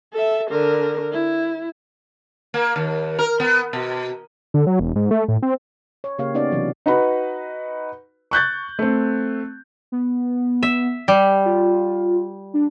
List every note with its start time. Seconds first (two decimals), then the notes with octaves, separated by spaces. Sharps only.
0.13 A4 E5
0.50 D3 A#4
1.11 E4
2.54 A#3
2.76 D#2
3.19 A#4
3.40 B3
3.73 B2
4.54 D3
4.67 F#3
4.80 E1
4.96 G#2
5.11 A3
5.28 A2
5.42 C4
6.04 C#5
6.19 C#3 A#3 G4 C#5 F5
6.34 B3 C#4 D#4 G4 D5
6.52 C3 E3 F#3
6.86 D#4 F#4 B4 B5
8.31 C#6 F#6 G6 A6
8.79 A3 C4
9.92 B3
10.63 E5
11.08 G3
11.46 F4
12.54 D4